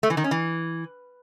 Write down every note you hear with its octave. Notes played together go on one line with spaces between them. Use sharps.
A3
E3
D#3
C#4
E3